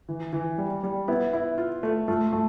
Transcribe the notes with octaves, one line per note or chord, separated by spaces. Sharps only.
E3
E3
G3
G3
B3 E4
E4
F4
A3
A3 F4
A3